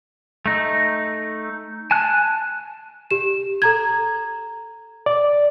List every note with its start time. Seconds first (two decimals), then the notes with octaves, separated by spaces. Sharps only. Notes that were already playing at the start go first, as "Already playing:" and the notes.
0.46 A3 D#4
1.91 G#5 A5 F#6
3.11 G4 E7
3.62 A4 A#5 G#6
5.06 D5